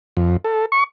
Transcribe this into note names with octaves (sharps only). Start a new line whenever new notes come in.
F2
A4
C#6